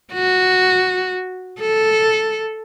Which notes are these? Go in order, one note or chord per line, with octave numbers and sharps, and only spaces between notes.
F#4
A4